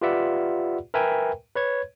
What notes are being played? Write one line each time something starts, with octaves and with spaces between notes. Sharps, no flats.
F4 G4 B4 D5 E5 F#5
A#4 B4 E5 G5 G#5
B4 C#5 G#6